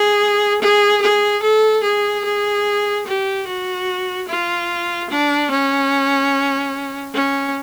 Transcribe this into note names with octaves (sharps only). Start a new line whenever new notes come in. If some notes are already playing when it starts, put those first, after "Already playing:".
Already playing: G#4
G#4
G#4
A4
G#4
G#4
G4
F#4
F4
D4
C#4
C#4